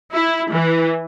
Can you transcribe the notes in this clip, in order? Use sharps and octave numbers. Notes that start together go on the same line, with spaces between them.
E4
E3